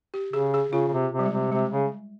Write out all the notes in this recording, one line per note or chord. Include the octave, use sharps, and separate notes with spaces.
G4
C#3 G#4
G#4
C#3 F4
C#3
C3
C3
G3
G#3
C3
C3 G#3
C#3